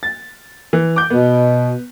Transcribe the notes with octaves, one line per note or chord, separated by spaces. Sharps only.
A6
E3
D6 G6
B2 B3